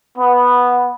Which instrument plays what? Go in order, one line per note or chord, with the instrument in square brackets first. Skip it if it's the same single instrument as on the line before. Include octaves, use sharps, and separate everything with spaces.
[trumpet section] B3